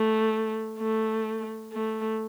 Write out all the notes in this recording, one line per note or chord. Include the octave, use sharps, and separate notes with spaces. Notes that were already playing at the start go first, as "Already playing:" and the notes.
Already playing: A3
A3
A3